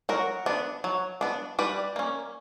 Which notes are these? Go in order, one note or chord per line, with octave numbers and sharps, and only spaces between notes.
F#3 F#4 A#4
B3 D4
F#3
B3 D4
G3 B4 D5
A#3 C#4